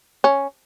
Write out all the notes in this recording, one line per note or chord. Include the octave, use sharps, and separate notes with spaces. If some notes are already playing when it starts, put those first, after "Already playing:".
C#4